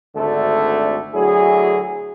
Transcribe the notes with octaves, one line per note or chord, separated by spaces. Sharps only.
G#1 D2 D3 A3 A4
D2 F#3 E4 G#4